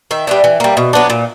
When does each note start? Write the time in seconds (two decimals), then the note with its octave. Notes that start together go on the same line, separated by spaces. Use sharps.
0.11 D#3 E5
0.27 G3 B3 D4
0.44 E3
0.60 G3 A#3
0.77 B2
0.93 F#3 B3 D4
1.10 A#2